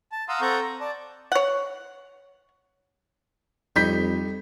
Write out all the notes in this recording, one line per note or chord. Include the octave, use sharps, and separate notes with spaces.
A5
F5 F#5 A#5 C6 D#6 E6
C4 A4 F#5 A#5 C#6 G6
A#5
D5 A5
C#5 F#5
F2 G3 D#4 G6 B6